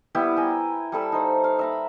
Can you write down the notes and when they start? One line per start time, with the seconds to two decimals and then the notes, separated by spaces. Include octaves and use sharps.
0.15 G3 B3 E4 G4
0.36 G5 G#5 A#5
0.92 G3 A4 B5 E6
1.12 D#4 C5
1.44 F5
1.59 E5 A#5 B5